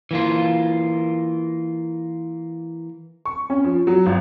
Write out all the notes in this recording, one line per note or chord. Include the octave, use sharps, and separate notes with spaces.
E3 A#3 F4
C#6
C#4
F3
F#3
G#1